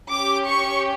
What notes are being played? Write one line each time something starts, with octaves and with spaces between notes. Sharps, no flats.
C#4 G4 D6
C#6